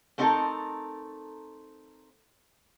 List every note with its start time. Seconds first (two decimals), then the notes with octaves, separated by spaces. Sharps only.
0.18 A3 B3 C4 D#4 A4 A#4